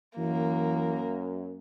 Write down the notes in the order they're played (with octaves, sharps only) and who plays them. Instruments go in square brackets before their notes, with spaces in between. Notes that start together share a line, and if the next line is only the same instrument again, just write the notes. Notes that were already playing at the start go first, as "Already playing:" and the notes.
[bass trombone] F#2 [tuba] E3 [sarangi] A#3